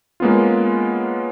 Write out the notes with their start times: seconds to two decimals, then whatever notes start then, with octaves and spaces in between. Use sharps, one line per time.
0.20 G#3 A#3 B3 C#4 F4